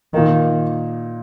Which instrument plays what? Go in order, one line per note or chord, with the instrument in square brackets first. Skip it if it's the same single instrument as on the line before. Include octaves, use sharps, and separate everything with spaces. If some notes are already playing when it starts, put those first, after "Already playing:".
[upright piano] A#2 A#3 D#4 [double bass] D#3